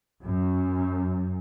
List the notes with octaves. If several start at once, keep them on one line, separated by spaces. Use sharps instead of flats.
F#2